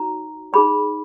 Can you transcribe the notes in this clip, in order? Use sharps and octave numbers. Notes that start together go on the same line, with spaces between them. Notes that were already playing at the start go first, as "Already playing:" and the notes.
Already playing: D#4 F#4 C#5 A#5
D#4 G#4 C#5 B5